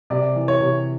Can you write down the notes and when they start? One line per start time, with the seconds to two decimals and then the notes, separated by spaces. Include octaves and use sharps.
0.10 C3 D5
0.35 E3
0.48 C#5
0.61 C3